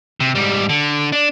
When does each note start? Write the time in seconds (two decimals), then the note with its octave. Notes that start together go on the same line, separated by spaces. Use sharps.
0.20 C3
0.35 G#2 G3
0.69 D3
1.12 D4